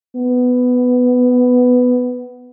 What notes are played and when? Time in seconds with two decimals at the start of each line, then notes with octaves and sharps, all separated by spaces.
0.16 B3